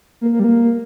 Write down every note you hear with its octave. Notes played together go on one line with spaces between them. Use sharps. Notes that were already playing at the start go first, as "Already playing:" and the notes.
A#3
A#3
G3
A#3